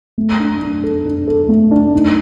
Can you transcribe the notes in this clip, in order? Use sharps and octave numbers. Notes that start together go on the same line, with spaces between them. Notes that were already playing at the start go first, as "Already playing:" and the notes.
A3
D4
D4
A4
D4
A4
A3
D4
D#4